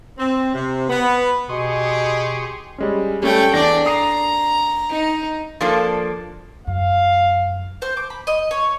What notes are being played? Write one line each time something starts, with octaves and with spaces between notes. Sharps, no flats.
C4
C3
B3
B2 G4 G#4 C6 C#6 D#6
G3 G#3 C#4
G3 A3 C#4 G5
E2 D4 D5 A#6 C7
A#5 D#6 C7 D#7
D#4
F3 A#3 D4 A4
F#2 F5
C5
D6
B5
D#5
C#5